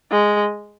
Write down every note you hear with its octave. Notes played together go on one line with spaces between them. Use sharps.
G#3